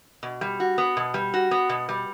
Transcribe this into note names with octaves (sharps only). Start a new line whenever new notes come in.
B2
G3
F#4
B3
B2
G3
F#4
B3
B2
G3